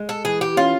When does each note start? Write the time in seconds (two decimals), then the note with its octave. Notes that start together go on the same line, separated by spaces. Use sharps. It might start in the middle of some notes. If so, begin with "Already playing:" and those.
Already playing: G#3
0.09 A4
0.25 E3 G#4
0.41 G4
0.57 C#4 F4